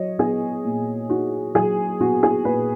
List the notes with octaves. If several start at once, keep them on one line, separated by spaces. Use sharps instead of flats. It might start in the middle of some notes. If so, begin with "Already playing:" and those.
Already playing: F#3 C#5 D#5
B3 G#4
A#2
D#4 F#4
F#3 G#4
B3 F#4
G#4
A#2 B4